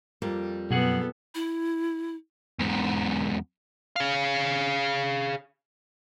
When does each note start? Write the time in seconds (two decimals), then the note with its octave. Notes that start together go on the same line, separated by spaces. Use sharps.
0.22 F2 G3 A#3
0.71 F#2 B2 B3 G#4 A4 F#5
1.35 E4
2.60 E2 G#2
3.96 G#4 F5